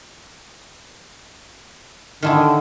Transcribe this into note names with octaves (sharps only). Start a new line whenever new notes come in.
D3 D#3 E4 G#4